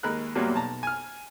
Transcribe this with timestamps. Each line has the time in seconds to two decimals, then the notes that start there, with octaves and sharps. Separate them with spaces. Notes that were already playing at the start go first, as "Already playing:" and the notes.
0.03 D#2 G#3 A#4 B5 F#6
0.35 E2 A#2 F#3 G3 A#3
0.55 B1 A5 A#5
0.83 G#5 F6